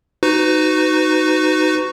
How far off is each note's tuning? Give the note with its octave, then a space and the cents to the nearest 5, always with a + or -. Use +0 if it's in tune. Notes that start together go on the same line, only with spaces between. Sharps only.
D#4 +0 F#4 +0 B4 +35